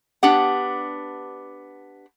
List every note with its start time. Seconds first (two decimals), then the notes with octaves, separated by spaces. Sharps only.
0.23 B3 D4 G4 F#5